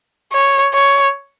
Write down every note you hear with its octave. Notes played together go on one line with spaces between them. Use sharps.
C#5
C#5